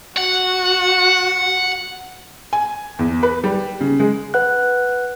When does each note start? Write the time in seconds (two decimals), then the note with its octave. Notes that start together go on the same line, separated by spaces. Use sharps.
0.17 F#4 F#5
2.53 G#5
2.99 E2
3.23 B4
3.44 G3
3.81 C#3
4.00 G#3
4.34 B4 F#5 F#6